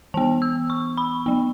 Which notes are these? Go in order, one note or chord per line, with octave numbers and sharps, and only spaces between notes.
E3 B3 A5
E6
C#6
B5
F#3 B3